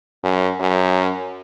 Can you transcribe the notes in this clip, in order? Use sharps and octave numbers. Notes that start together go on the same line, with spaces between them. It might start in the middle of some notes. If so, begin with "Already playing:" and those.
F#2
F#2